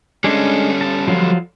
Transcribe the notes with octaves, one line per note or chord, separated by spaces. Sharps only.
G3 G#3 C#4 D4 G#4 A4
A5
F3 F#3 F4